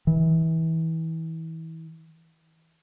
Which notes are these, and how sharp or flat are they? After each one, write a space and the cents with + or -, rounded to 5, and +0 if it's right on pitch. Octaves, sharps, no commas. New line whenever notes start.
E3 -30